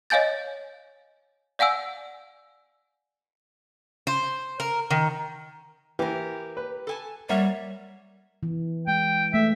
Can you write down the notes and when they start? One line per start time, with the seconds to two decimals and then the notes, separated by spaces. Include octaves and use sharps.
0.10 C#5 D#5 F5 G#5 G6 A6
1.59 D5 F5 F#5 G#5 E6
4.07 C5
4.60 A#4
4.90 D#3
5.99 E3 G4 A#4
6.57 B4
6.87 A4 G#5 A5
7.29 G3 A#3 C#5 E5 F#5
8.43 E3
8.87 G#3 G5
9.34 A3 E5